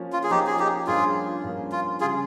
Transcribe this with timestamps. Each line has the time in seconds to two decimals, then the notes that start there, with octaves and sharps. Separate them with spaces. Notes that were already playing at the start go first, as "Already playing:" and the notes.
Already playing: F3 A#3 C#4
0.13 F4
0.23 G#4
0.30 F3 A#3 C#4 D#4 G4
0.47 G#4
0.59 D#4 G4
0.87 G2 F3 A#3 C#4 F4 G#4
1.44 G2 F3 A#3 C#4
1.72 F4
2.01 C#3 G3 C#4 F4 G#4